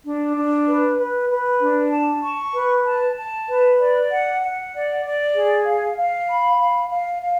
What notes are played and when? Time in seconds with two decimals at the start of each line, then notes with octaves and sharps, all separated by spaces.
0.04 D4
0.35 D4
0.67 B4
0.98 B4
1.29 B4
1.60 D4
1.91 A5
2.22 C#6
2.53 B4
2.85 A5
3.16 A5
3.47 B4
3.79 D5
4.10 F#5
4.41 F#5
4.72 D5
5.03 D5
5.34 G#4
5.65 F5
5.97 F5
6.29 B5
6.59 F5
6.90 F5
7.22 F5